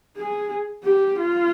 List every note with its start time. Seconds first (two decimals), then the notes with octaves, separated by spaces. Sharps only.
0.17 G#4
0.84 G4
1.18 F4